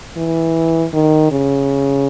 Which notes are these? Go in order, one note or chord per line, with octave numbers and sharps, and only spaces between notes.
E3
D#3
C#3